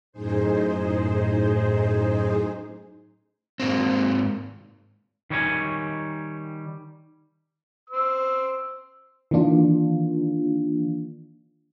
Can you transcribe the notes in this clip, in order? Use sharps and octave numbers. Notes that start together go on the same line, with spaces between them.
F#2 A2 D#4 G#4 C5
G#2 A#3 C4
D#3 G3 C#5 D#5 G#5
C5 E6
D#3 E3 A#3 D4 F4